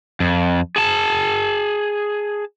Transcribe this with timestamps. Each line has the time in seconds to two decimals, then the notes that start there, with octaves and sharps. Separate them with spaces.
0.20 F2
0.76 G#4 A5